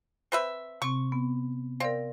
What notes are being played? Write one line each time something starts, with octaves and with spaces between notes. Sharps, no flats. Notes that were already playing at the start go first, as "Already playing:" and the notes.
C4 B4 E5
C3 C4 C#6
B3
C4 A#4 D5 F5